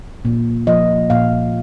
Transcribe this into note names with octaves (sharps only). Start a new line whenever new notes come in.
A#2
F3 A#3 D#5
A#2 F5